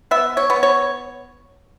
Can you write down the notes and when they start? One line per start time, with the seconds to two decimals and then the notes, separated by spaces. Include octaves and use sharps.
0.11 B3 E5
0.37 C#5
0.50 B3
0.63 C#5